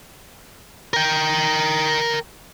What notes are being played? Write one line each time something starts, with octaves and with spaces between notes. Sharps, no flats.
A#4 G5